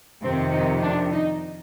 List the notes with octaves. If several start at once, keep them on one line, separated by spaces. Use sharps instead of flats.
F2 C3 D#3 C4
D#4
D4
D#4